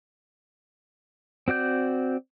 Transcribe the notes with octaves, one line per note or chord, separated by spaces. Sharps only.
C4 F#4 D5 G6